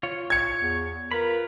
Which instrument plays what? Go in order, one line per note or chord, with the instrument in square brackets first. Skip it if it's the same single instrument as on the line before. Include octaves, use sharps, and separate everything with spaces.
[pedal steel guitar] F4 C#5
[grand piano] G#6 C#7
[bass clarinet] E2
[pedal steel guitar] F4 B4 B5 [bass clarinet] A#4